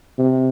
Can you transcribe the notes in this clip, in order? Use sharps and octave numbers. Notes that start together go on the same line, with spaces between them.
C3